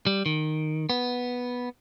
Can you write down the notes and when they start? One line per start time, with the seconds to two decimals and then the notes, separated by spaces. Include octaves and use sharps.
0.07 G3
0.26 D#3
0.90 B3